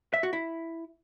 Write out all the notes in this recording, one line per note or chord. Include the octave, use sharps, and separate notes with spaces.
E5
F#4
E4